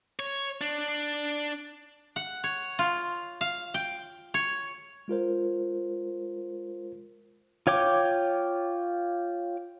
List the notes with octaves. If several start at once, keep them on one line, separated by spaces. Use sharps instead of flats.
C#5
D4
F#5
C#5
F4
F5
G5
C#5
G#3 F4 A#4 C5
F4 C#5 G5 D6